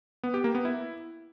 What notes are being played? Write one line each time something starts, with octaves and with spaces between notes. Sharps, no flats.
B3
G4
A#3
B3
E4